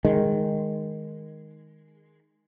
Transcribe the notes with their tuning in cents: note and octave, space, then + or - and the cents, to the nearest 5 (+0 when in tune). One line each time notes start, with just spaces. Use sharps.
D#3 +0 G#3 +0